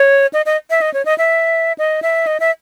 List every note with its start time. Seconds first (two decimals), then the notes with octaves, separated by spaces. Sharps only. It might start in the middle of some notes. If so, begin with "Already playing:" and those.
Already playing: C#5
0.33 D#5
0.46 D#5
0.70 E5
0.81 D#5
0.94 C#5
1.05 D#5
1.18 E5
1.78 D#5
2.02 E5
2.27 D#5
2.40 E5